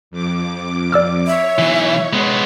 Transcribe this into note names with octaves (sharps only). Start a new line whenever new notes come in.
F2 D6
D5 E6 F6
C#5 E5
B1 E3
G#3 B3